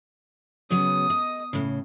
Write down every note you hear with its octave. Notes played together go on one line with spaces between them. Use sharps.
C#3 F#3 B3 D#6
D#5
A2 C#3